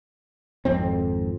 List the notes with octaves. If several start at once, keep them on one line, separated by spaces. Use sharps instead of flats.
G#1 F2 C4